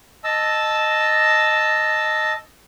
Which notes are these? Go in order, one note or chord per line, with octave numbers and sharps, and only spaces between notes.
D#5 A5 E6